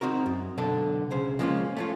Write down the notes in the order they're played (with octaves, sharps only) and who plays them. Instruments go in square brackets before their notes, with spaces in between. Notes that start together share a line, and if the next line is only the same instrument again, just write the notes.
[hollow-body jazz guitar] C4 D#4 F#4 A#4
F#2
B1 D3 A4 A5
C#2 C#3 C5
F3 G#3 A#3 C4 C#4 F4
A3 C#4 F4